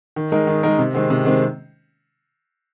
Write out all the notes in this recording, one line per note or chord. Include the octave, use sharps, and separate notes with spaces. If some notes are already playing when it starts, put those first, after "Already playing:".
D#3
G#3 D#4 A#4
D#3
G#3 D#4 A#4
C3
D#3 G#3 C4
C3
D#3 G#3 C4